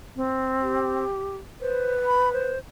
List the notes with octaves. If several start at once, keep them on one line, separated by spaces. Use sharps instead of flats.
C4
G4
B4 C5
B5
C5